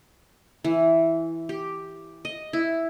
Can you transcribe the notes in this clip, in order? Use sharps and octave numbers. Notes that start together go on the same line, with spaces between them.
E3
G4
D#5
E4